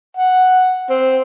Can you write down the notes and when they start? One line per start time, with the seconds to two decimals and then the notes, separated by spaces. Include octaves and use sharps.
0.17 F#5
0.90 C4